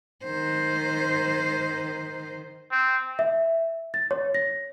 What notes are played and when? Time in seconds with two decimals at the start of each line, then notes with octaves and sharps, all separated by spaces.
0.24 D#3 C5
2.72 C4
3.19 E5
3.94 A6
4.11 C#5
4.34 A#6